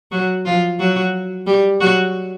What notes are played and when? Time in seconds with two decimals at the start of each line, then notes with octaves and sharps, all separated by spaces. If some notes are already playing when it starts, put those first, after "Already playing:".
0.12 F#3 F#4
0.46 F3 F4
0.79 F#3 F#4
1.47 G3 G4
1.80 F#3 F#4